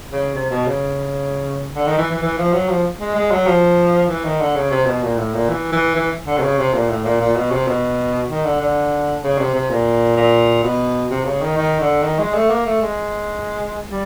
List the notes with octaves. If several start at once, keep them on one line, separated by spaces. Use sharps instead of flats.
C#3
C3
B2
C#3
D3
D#3
E3
E3
E3
F3
F#3
F3
G#3
G#3
F#3
F3
E3
D#3
D3
C#3
C3
B2
A#2
A2
A#2
E3
E3
E3
D3
C3
C#3
C3
A#2
A2
A#2
A#2
B2
C3
B2
D#3
D3
D3
C#3
C3
C3
A#2
A#2
B2
C3
C#3
D#3
D#3
D3
D#3
G#3
A3
A#3
A3
G#3
G3